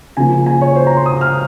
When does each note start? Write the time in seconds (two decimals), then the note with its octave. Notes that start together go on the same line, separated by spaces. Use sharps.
0.17 C#3 F3 A#3 G#5
0.46 G#5
0.61 C#5
0.76 C5
0.87 A#5
0.96 C6
1.06 D#6
1.21 F6